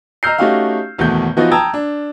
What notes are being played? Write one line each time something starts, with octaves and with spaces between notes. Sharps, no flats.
D#5 A#5 E6 F6 G6 C7
A3 C#4 D#4 F#4 G4 F5
G#1 E2 B2 A3 G6
E3 F3 B3 D#4 F4 F#4
G5 A5 A#5 D#6 E6 G#6
D4